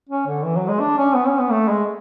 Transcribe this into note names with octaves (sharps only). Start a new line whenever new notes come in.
C#4
D3
E3
F#3
G#3
D4
C#4
B3
C#4
B3
A3
G#3